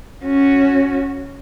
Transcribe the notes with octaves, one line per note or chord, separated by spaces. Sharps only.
C#4 F#4